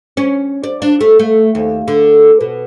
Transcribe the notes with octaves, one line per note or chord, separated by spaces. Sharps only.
C#4
D5
D4
A3
A3
D#2
D3
B2